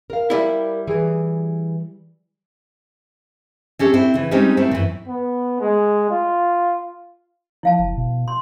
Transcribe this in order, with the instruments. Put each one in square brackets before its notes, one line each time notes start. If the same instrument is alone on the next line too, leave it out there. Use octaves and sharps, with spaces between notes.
[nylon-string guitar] A#4 F5
[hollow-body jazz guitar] G3 E4
[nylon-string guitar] E3 G#4
C4 C#4 G4 A4
C4 D4 E4
C#3 E3
G3 G#3 C4 C#4 D#4
A3 C4 E4 A#4
F#2 E3
[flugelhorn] B3
G#3
F4
[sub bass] F3 [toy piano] E4 F5 A5
[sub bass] F#1
B2
[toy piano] C6